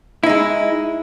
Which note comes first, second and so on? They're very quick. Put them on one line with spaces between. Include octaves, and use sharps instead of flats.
E4 D#4 G#3